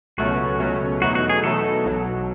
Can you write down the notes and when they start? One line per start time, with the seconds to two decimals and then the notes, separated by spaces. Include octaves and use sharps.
0.18 C#2 B2 F#3 A3 C#4 F#4
0.60 C#2 B2 F#3 A3 C#4
1.02 E2 B2 F#3 A3 D#4 F#4
1.15 F#4
1.29 G#4
1.44 E2 B2 F#3 A3 D#4 A4
1.85 B1 B2 F#3